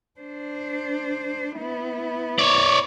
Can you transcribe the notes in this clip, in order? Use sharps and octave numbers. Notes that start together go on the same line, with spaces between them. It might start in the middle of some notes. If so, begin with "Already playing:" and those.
D4 C5
B3 E4
C#5 D5